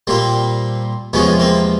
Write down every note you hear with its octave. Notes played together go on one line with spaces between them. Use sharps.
A#2 G3 A#3 C4
E2 C3 F3 G#3 B3 C#4
A#3 C4